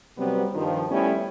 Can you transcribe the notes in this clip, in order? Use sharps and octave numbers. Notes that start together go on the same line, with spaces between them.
C3 F#3 G3 B3 C4
G2 D#3 F3
G3 A3 B3 C#4 E4